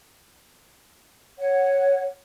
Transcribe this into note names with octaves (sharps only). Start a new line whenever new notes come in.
C#5 F#5